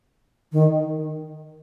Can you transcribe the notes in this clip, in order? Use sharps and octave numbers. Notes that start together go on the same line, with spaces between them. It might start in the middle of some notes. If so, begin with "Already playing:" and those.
D#3